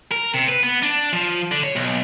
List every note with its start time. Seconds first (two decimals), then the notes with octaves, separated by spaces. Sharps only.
0.11 A#4
0.34 C3
0.49 B4
0.63 B3
0.83 D4
1.13 F3
1.52 D3
1.64 C#5
1.76 B1